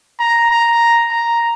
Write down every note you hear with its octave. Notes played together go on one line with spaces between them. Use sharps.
A#5
A#5
A#5